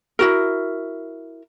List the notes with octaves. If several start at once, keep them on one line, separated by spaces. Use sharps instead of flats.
E4 F#4 A#4